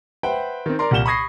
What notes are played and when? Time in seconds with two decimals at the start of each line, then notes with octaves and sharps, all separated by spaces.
0.23 B4 C5 E5 F#5 G5
0.66 D#3 C4
0.79 A#4 D5 A#5 C6
0.91 C2 A#2 F#5 E7 G7
1.06 B5 C#6 D#6 G#6 A#6 C7